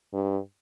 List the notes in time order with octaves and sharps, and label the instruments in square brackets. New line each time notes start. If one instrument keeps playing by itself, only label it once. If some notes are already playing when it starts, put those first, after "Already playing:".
[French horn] G2